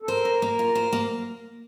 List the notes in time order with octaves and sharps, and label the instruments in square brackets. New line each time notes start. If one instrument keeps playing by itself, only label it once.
[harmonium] A4
[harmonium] A#4 [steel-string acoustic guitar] C5
[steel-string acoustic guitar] A#3
A#3
F4
C5
A#3